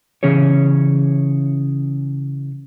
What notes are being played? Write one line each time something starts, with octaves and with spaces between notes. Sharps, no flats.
C#3 E3 C#4 G#4 C#5